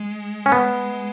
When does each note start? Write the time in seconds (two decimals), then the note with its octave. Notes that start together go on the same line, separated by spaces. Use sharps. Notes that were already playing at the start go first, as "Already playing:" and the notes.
Already playing: G#3
0.46 C#4
0.52 B3